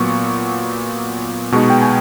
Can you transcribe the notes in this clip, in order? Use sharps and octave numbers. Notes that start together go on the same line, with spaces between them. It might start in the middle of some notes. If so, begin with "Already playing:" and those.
Already playing: A#2 F#3 B3 C#6
B2 G#3 B3 D#4 C#6
G5
G#5